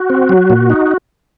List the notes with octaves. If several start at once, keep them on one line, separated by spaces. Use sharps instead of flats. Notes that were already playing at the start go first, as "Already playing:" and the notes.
Already playing: F#4
C4
F#3
A#2
D#4